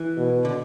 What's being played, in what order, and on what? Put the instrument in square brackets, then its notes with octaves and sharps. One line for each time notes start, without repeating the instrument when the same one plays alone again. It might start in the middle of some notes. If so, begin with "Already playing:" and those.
Already playing: [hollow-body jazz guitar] E3
[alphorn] B2
[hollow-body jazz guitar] D3